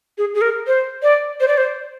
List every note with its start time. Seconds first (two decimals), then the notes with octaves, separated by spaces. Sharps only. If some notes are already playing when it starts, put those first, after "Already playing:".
0.18 G#4
0.34 G#4
0.41 A#4
0.67 C5
1.03 D5
1.40 C5
1.48 D5
1.57 C5